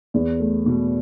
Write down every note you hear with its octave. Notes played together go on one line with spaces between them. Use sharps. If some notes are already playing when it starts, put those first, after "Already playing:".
E2
A3
B2